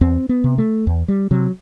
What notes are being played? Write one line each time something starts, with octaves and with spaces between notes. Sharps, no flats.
E2 C4
B3
C3
A3
E2
G3
C3 F#3